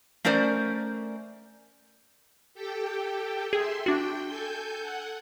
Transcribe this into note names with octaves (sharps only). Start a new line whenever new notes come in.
A3 C#4 A#4 C5 D5
G4 A4 G5
G#4 E5 C6
D4 F#4 G5
A4 G#5 G6
F#5